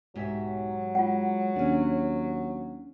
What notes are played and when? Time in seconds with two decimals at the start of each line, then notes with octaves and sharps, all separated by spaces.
0.16 B1 G#2 F#3 G4 E5
0.95 G#3 F4 F#5
1.56 D#2 C#4 D4